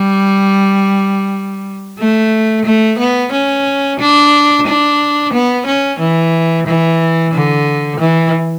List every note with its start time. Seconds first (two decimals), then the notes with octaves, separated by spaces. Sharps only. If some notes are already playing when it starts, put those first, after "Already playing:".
Already playing: G3
1.99 A3
2.65 A3
2.99 B3
3.33 C#4
3.99 D4
4.67 D4
5.33 B3
5.67 C#4
6.00 E3
6.67 E3
7.33 D3
8.00 E3